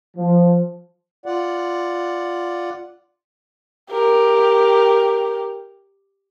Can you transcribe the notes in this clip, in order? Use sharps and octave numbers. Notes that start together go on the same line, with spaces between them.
F3
F4 D5 F#5
G4 A#4